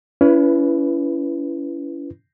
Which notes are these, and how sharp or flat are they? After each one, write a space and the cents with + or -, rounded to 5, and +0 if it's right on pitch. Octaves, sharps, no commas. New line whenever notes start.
C#4 +35 E4 +25 B4 +0